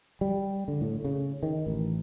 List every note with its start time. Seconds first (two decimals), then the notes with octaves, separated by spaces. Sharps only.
0.21 G3
0.68 D3
0.81 A2
1.05 C#3
1.43 D#3
1.66 A1